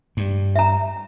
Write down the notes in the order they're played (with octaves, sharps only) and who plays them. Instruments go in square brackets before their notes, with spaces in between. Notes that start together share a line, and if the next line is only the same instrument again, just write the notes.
[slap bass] G2
[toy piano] E5 A#5